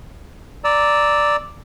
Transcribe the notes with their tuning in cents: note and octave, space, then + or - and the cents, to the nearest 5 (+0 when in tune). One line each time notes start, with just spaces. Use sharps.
D5 +0 A#5 -5 E6 -15